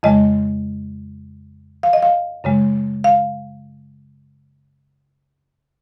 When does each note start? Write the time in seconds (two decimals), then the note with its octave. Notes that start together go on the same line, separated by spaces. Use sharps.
0.03 F2 C#3 G#3 D#5
1.83 F5
1.93 D#5
2.03 F5
2.44 F#2 C#3 G#3
3.04 F5